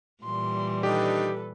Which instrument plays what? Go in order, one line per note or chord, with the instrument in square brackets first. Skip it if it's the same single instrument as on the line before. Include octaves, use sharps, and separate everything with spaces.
[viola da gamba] A#2 E3 G3 [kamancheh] C6
[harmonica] D#3 D4 D#5 [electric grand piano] G4 [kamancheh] A4 B4